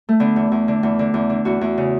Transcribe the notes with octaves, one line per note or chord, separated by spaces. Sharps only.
A3
D3 B3
E2
E2
D3
E2
D3
E2
D3
E2 F#4
E2
C#3